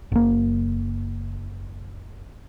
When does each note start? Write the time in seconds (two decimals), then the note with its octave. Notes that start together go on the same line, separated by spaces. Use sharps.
0.12 F#1 A#3